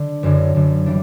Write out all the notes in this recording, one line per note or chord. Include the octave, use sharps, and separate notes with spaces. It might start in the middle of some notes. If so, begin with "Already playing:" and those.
Already playing: D3
F#1 F#2 D3
F#1 F#2 D3
E3 G3 D4